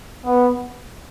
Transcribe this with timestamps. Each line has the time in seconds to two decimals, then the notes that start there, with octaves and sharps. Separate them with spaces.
0.25 B3